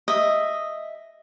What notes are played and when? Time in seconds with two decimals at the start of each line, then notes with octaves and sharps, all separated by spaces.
0.08 D#5 E5